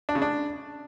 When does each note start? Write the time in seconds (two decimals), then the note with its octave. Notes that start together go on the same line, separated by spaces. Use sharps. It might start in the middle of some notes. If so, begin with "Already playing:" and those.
0.09 D4
0.15 C#3
0.22 D4